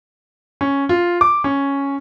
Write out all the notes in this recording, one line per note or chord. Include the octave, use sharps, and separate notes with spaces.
C#4
F4
D6
C#4